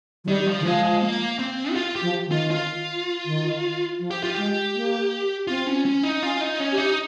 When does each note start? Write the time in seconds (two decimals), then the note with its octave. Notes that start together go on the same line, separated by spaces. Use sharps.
0.24 F3
0.28 D#3 G3
0.46 F3
0.60 D#3
0.65 F3 G#3
0.84 G#3
1.02 A#3
1.39 C4
1.72 G4
1.76 F4
1.96 G4
2.01 F3
2.26 D#3
2.32 F4
2.51 F4
3.25 D#3
3.99 F3
4.11 G4
4.23 F4
4.34 G#3 G4
4.74 A#3
5.47 C4 F4
5.67 C#4
5.86 C#4
6.03 D#4
6.22 C#4 F4
6.41 D#4
6.60 C#4
6.72 G4
6.78 D#4